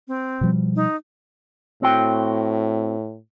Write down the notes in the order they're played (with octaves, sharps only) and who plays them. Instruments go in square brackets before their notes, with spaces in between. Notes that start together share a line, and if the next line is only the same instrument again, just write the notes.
[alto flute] C4
[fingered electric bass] B2 F3 G3
[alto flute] D#4
[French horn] A2 [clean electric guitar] C4 F#4 G5